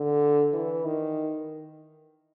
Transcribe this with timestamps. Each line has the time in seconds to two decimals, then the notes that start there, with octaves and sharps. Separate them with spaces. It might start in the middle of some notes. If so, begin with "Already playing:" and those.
Already playing: D3
0.53 E3
0.85 D#3